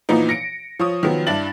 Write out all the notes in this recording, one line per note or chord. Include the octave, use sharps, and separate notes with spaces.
A#2 E3 F3 B3 D#4
A#6 C#7 D7
F3 C#5 D#6
D#3 F3 F#3 B3
G2 D4 E4 A6 F#7